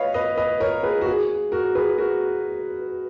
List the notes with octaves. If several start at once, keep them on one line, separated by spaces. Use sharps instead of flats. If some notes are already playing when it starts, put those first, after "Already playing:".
Already playing: B4 C#5 D#5 F5
B4 D#5
B4 D#5
A#4 C#5
G#4 B4
F#4
G#4
F#4 A#4
G#4 B4
F#4 A#4